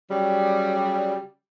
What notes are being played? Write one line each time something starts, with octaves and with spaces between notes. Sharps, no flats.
C#3 F#3 G3